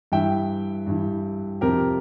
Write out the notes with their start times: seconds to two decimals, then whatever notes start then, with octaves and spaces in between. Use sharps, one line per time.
0.12 G2 E3 E5 G5
0.87 G2 E3
1.61 F2 C3 F3 G4 A#4